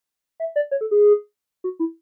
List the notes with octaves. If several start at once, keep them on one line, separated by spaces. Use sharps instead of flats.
E5
D5
C#5
A4
G#4
F#4
E4